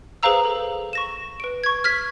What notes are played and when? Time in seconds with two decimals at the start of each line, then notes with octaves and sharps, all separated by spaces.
0.23 G#4 B4 C5 F5 A#5 E6
0.45 A4
0.93 C#6 A#6 E7
1.40 B4 D7
1.64 C#6 G#6
1.84 F6 G#6 B6